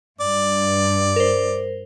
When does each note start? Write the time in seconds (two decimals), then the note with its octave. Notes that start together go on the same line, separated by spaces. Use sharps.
0.21 G2 D5
1.16 A#4 C5